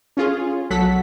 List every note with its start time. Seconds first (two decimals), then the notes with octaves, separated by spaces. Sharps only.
0.17 C#4 F4 G#4
0.70 B1 F#3 A4 F#5 B6